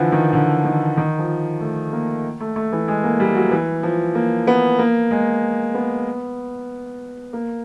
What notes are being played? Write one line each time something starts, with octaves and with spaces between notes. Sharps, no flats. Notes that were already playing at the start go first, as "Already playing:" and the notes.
Already playing: D3 E3 F3
D#3
D3
D#3
D#3
F3
A3
A#3
A3
A3
E3
G#3
A#3
G3
F#3
E3
F3
A#3
B3
A#3
G#3
B3
A#3